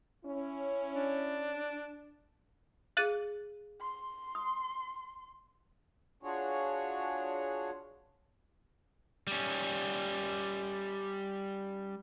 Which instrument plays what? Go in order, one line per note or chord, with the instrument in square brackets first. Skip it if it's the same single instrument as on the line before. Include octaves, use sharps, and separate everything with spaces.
[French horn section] C#4 E4
[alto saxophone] D4
[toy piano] G#4 F5 [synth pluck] F#6 A6 D#7
[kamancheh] C6
[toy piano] D#6
[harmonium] D4 F4 F#4 G#4 C#5
[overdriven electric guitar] G3 C#4